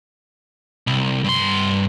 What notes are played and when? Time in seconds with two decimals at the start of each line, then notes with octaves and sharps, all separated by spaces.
0.87 C2
1.24 G2 C6